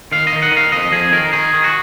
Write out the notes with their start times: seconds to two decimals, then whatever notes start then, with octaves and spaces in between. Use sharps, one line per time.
0.12 D#3 F5
0.27 D#5
0.33 D#3
0.42 F#5
0.52 D#3
0.57 F5
0.72 F2 D#5
0.92 F2 G#4
1.12 D#3 A#4
1.33 D#3 G#4
1.53 D#3
1.64 F#4